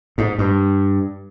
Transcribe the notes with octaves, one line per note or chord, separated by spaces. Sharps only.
G#2
G2